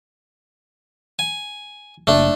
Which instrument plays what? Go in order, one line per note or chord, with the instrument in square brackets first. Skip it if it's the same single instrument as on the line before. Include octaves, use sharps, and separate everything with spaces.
[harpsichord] G#5
[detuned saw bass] F#1 [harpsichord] A3 D4